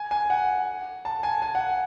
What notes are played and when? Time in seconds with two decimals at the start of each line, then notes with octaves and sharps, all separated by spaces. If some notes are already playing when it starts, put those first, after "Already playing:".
Already playing: G#5
0.11 G#5
0.30 F#5
1.05 A5
1.23 G#5
1.42 G#5
1.55 F#5